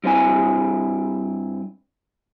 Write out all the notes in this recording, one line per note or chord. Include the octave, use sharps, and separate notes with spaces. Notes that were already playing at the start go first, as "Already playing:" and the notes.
G2 C4 E4 G#5